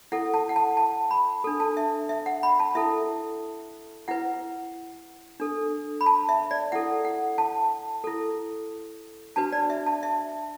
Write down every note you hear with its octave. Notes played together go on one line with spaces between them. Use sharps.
E4 A4 F#5
A5
F#5
A5
A5
B5
D4 A4
A5
E5
E5
F#5
B5
A5
E4 A4 E5
E4 B4 F#5
D4 A4
B5
A5
E5
D5
E4 A4 F#5
F#5
A5
E4 A4
D4 F#4 B4 A5
D5
E5
A5
E5